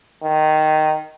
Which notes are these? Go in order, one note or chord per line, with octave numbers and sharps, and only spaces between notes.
D#3